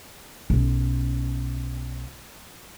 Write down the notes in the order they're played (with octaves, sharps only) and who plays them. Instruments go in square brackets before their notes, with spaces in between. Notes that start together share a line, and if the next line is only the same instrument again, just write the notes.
[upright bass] B1 C#4